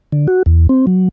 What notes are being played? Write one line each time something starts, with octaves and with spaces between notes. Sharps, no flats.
D3
F#4
E2
C4
F#3